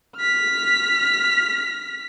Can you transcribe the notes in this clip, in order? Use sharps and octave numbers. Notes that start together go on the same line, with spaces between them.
F6 B6